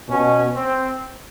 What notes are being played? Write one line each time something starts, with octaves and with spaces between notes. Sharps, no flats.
B2 C#4
C4